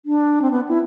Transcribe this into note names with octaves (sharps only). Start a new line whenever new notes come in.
D4
C4
B3
E4